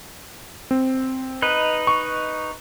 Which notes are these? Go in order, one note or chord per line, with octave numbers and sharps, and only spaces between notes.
C4
D#4 B4 D#5
C#6